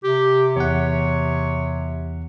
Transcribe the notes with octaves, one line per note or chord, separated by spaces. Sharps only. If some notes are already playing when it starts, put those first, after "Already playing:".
C3 G4
E2 C#5 F#5